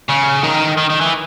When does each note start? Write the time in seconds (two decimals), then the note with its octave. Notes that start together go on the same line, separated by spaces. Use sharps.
0.09 C#3
0.44 D#3
0.77 D#3
0.90 D#3
1.01 E3